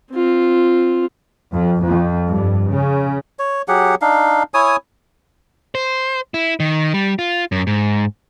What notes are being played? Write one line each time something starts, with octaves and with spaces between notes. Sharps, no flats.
C4 F4
F2
F2
G2
C#3
C#5
F#3 G4 G#4 F#5
D4 D#4 F5
E4 C#5 G#5 D#6
C5
E4
D#3
G3
F4
F#2
G#2